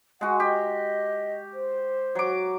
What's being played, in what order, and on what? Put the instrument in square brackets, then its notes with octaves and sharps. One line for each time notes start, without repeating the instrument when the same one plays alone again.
[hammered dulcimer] G#3 F#4 [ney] F#5
[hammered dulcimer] G4 [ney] D#5
[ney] C5
[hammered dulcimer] F#3 D6